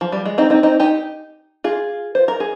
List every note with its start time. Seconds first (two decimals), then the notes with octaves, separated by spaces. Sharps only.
0.01 F3
0.12 G3
0.25 G#3
0.38 C4 D#4
0.50 C4 D#4
0.63 C4 D#4
0.80 D#4 G4
1.64 F4 G#4
2.15 C5
2.28 A#4
2.40 G#4